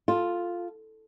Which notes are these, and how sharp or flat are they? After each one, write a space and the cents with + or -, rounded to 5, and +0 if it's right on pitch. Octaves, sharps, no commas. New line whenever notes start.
F4 +0 A4 +0